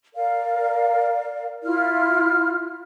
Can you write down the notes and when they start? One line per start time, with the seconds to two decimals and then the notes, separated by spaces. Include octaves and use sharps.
0.14 A#4 D5 F5
1.64 E4 F4 F6